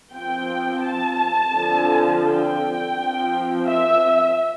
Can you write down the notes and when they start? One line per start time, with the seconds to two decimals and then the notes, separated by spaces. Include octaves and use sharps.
0.12 F3 C4 G5
0.83 A5
1.54 D3 F3 C4
2.26 G5
2.96 F3 C4
3.68 E5